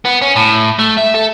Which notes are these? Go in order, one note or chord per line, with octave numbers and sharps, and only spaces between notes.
B3
C#4
A2
A3
E5
A4